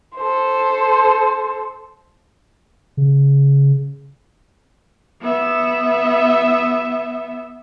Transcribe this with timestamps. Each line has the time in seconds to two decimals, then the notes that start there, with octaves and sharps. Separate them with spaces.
0.17 A4 C5
2.97 C#3
5.21 B3 E5